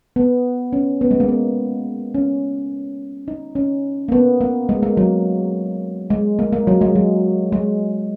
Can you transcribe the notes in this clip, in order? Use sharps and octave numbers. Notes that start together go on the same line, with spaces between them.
B3
C#4
B3
G#3
A#3
B3
C#4
D#4
C#4
A#3
B3
A#3
G#3
A#3
F#3
G#3
A#3
A#3
F#3
G#3
F#3
G#3